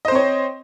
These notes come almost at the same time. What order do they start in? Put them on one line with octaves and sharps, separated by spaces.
D#5 C5 C4 C#5